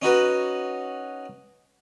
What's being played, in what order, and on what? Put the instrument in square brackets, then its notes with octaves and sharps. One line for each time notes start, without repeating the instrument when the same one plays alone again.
[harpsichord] C#4 D#4 F#4 B4